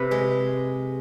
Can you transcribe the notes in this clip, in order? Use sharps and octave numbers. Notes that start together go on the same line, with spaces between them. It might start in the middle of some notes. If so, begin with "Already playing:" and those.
Already playing: C3 B4
G#3